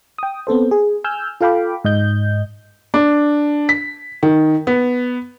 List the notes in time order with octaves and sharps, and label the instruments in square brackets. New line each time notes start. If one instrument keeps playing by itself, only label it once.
[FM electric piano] G5 D#6
B3 C4 A4 C5
G#4
G#5 E6 F6 G6
F4 A4 F5 G5 B5 D6
G#2 D#5 G6
[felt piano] D4
B6
D#3
B3